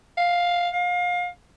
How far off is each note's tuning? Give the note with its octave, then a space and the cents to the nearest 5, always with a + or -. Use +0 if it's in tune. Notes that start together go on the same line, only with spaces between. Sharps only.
F5 +10
F5 +30